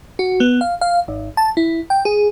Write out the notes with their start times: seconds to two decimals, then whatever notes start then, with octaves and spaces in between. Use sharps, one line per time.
0.19 F#4
0.40 B3
0.61 F5
0.81 F5
1.08 G#1
1.37 A5
1.57 E4
1.90 G5
2.05 G#4